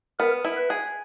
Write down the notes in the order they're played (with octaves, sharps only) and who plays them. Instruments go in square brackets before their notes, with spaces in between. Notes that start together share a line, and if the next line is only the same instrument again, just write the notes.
[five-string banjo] B3 [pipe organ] A#4
[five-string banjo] E4
[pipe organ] B4
[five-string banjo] G#4